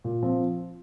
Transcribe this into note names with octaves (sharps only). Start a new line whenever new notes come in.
A#2
F3 C4